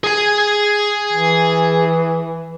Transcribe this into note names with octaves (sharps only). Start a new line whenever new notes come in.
G#4 G#5
E3